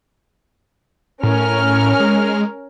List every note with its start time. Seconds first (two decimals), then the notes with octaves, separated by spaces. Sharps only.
1.23 A2 C#4 A#4 F6
2.00 G#3